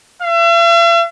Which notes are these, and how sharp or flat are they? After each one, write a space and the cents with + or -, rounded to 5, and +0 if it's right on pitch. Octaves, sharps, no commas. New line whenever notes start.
E5 +45